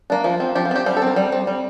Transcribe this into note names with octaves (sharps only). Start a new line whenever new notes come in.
A#3 D4
F3 F4
C4
F3 G4
F4
C4 G4
G3 C5
A4
C4 A#4
G3
C4
G3